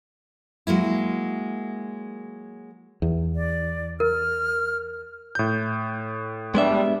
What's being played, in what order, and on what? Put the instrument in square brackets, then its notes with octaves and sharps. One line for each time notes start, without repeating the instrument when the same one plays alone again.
[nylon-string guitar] F#3 G#3 A#3 E4
[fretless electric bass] E2
[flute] D5
[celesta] A#4 [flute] F6
[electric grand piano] A2 G6
[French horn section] G3 D4 [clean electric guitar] G#3 B3 E5